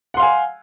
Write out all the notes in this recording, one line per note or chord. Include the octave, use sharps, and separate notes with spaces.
F5 F#5 G#5 C6